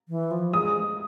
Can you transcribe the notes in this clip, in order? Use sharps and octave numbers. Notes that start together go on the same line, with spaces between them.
E3
F3
G#3 D#6